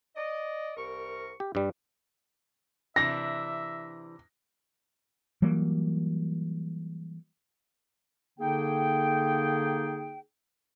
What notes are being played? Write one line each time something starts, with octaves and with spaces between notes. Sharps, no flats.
D5 D#5
C2 A#4 C#6
G4
G2 G3
C3 E3 D4 E5 A#6
E3 F#3 G3 A#3
D3 A#3 D#4 G#4 G5